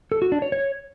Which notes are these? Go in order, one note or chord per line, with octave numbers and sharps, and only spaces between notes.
A4
F#4
D4
C#5
C#5